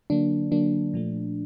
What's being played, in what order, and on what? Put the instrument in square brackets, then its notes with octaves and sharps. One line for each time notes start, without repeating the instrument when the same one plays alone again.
[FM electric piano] D3 F#3 A#3 D4
D3 F#3 A#3 D4
A#2 F3 A3